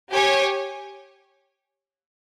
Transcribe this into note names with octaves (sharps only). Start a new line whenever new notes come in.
G4 C#5 G#5